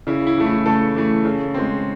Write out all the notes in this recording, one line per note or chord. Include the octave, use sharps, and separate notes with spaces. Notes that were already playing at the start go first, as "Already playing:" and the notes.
C#3 E4
E4
E3 A3
E4
C#3 A3 A4
E3 A3
C#3
G#3 C4